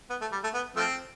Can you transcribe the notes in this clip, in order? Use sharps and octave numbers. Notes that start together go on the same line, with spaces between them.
B3
A3
G3
A3
B3
F3 A3 C4